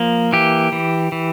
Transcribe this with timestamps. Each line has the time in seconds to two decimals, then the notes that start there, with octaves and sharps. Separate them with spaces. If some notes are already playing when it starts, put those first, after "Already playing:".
Already playing: F3 A#3
0.33 E3 G4
0.72 E3
1.12 E3